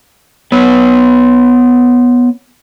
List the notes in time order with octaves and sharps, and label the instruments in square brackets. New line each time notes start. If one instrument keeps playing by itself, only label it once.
[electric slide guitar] B3 B4 C#5